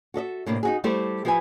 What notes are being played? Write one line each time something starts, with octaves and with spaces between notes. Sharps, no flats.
F#4 A4 D#5 E5
A2 C3 A#3 D4
D#4 F#4 G#4
G3 A3 E4 G4 A4 C5
F3 E4 G4 B4 G#5